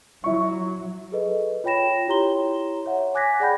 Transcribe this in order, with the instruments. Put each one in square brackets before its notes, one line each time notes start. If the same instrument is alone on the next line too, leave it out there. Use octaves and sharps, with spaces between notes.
[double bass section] F#3 [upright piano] E4 C#6
[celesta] G#4 A4 B4 D#5
F4 C#5 G5 B5 A#6 E7
E4 G4 C#5 A#5 C6 G7
C#5 E5 F#5
G#5 D6 F#6 G#6 A#6 B6
G#4 D5 F#5 G5 B5 G6